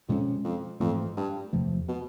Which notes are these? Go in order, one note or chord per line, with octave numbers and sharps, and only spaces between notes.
F2 B2 G#3 C#4
F2
F2 G#2 E3 A3
G2
E2 C3 F3 A3
B2